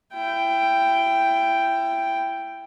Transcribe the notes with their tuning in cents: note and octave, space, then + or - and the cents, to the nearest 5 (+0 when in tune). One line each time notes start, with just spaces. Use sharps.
E4 +25 G5 +0